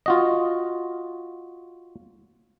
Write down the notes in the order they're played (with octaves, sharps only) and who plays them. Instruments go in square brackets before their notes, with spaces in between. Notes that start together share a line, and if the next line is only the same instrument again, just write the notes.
[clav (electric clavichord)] F4 F#4 D#5